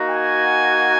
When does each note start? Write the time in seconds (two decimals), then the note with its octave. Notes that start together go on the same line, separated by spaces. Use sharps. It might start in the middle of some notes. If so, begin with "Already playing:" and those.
Already playing: A#3 D#4 F#4
0.09 G#5